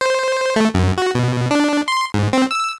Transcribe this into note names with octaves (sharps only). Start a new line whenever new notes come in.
C5
A3
F#2
F#4
B2
D4
C6
G#2
C4
E6